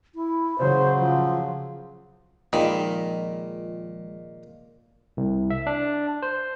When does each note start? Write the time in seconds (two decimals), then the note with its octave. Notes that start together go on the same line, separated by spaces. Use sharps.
0.15 E4
0.59 C#3 F#3 C5
0.99 F3
2.53 A#2 D#3 F3 G#3 B5
5.17 C2
5.50 E5
5.67 D4
6.22 C5